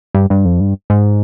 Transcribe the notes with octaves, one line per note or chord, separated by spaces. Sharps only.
G2
G2
F2
G2
G#2